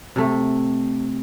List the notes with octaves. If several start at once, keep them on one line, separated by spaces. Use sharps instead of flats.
C3 A3